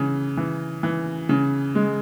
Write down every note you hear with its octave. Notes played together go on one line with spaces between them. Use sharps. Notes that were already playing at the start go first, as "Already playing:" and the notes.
Already playing: C#3 E3
E3
E3
C#3
G#3